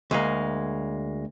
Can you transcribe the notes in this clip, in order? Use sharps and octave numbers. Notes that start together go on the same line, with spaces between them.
D2 G#3 A#3